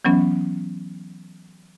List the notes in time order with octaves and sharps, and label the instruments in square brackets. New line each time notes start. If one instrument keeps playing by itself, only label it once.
[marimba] E3 F#3 B3 C#4